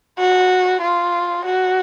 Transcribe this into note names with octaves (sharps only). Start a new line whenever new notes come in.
F#4
F4
F#4